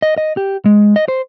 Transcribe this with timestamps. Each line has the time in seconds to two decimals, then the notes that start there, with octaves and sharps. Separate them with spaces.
0.02 D#5
0.18 D#5
0.37 G4
0.66 G#3
0.96 D#5
1.08 C5